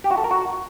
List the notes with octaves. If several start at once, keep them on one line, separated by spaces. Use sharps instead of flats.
G4
F#4
A4
A#4
F#4